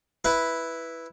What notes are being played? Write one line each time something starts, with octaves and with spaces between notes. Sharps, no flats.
E4 B4